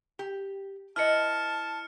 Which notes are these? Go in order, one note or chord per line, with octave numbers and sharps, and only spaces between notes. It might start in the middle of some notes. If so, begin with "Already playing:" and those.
G4
E4 B4 D#5 A5 F6 C#7